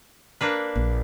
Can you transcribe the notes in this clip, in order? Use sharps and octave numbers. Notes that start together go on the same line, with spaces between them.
A#3 D4 B4
A#1